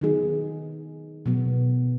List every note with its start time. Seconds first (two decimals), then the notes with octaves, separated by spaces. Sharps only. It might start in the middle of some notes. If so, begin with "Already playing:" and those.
0.01 D#3 F#3 B3 D#4 G#4
1.26 B2 F#3 B3